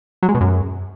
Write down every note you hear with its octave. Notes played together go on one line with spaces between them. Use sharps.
F#3
G#3
B2
F#2